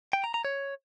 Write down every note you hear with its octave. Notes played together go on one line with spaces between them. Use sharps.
G5
A#5
A#5
C#5